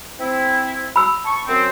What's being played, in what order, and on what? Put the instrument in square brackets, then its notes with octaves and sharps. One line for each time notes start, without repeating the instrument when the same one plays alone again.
[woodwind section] C4 E4
[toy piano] B5 E6
[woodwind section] A5 C#6
F#2 C4